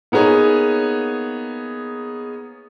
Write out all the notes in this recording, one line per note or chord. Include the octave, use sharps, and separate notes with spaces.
A#3 B3 D#4 G#4 C#5